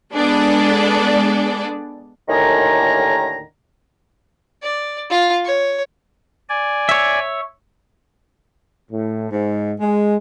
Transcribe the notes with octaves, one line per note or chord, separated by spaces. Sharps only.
G#3 B3 D4 G#4 A4 D5
D#2 A2 D3 D#3 G#5 A#5
D5
F4 F5
C#5
D5 G#5
C#5 E5
A2
G#2
G#3